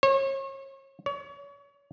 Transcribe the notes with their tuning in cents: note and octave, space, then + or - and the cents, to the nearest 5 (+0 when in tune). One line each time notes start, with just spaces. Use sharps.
C#5 -35
C#5 +35